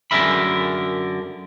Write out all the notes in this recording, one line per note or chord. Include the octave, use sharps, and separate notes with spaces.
F#2 D3 G#4 A#4 E5 B5